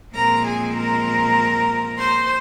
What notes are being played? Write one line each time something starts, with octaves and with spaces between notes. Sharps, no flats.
A#2 F3 G#3 C4 A#4 A#5
G#4 G#5
A#4 A#5
C5 C6